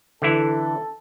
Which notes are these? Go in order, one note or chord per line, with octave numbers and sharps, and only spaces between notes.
D3 E3 E4 A4